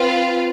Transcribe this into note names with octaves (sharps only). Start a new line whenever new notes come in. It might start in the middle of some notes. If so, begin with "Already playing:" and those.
Already playing: C4 F4 B4 F5